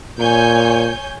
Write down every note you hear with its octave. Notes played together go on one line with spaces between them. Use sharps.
A#2 C#5 G#5 G6